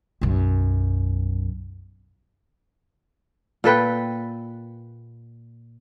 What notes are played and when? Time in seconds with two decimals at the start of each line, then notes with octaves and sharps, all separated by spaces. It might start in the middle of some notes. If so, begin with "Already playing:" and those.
0.21 B1 F#2
3.64 A#2 A4 B4 G5